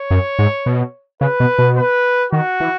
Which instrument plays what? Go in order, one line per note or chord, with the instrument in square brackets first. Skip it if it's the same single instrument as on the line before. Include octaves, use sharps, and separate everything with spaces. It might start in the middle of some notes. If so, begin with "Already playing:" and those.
Already playing: [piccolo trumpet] C#5
[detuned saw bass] F#2
G#2
B2
[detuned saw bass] C#3 [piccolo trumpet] B4
[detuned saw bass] B2
B2
[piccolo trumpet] B4
[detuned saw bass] D#3 [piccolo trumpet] F#4
[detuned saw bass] E3